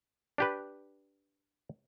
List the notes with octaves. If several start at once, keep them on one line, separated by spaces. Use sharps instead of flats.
D4 G4 B4